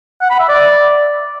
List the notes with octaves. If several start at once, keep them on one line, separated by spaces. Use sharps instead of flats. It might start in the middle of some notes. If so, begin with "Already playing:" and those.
F#5
B5
E5
D5